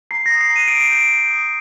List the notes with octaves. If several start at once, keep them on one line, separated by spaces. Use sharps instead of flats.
A#5 C7
A#6
D#6
C7
A#5
D#7
D#6 D7
C7
G6 D7
G6
D#6